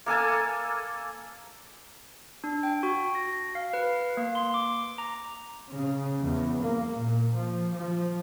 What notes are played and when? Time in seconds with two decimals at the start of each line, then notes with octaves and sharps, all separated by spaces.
0.06 A#3 A4 G#5 A5
2.44 D4
2.63 G5
2.83 F#4
3.15 A#6
3.55 F5
3.73 B4
4.17 A#3
4.35 C6
4.54 D6
4.98 A#5
5.73 C#3
6.21 E2
6.60 A#3
6.96 A#2
7.34 F3
7.73 F3